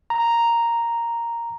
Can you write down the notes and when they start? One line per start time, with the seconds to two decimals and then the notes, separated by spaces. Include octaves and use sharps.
0.10 A#5